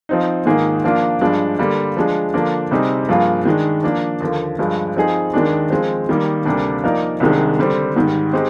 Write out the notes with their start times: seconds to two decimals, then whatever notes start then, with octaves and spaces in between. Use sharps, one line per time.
0.09 F3 C4 D#4
0.45 G#2 D#3 A#3 F4 G#4
0.84 F3 A#3 D4 F4
1.21 G2 F3 G#3 D4
1.59 D3 G3 A#3
1.97 F3 G#3 D4
2.34 D3 F3 A#3 D4
2.71 C3 G3 C4 D#4 G#4
3.09 G2 F3 A#3 F4 G#4
3.45 D#3 G#3 D4
3.83 F3 A#3 D4
4.20 D#2 D3 F3
4.59 G2 F3 G#3
4.96 F3 C4 D#4 G#4
5.33 D#2 D#3 G#3 D4
5.70 F3 G#3 C4
6.09 D#3 G3 A#3
6.45 D2 C3 G3 A#3 D4
6.84 F3 A#3 D#4 A#4 D5
7.20 C2 C3 D#3 G#3 D4
7.59 D3 G3 C4
7.96 G#2 D#3 G3
8.33 G#3 C4 D#4 G4